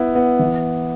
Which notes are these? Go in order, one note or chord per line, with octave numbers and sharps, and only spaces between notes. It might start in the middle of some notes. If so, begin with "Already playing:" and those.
Already playing: B3 E4
B3
E3